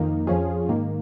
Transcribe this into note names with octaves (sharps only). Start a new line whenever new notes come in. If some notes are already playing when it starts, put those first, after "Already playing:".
Already playing: F2 D#3 A#3 D#4
F2 F3 C#4 F4 G#4
G#2 D#3 A#3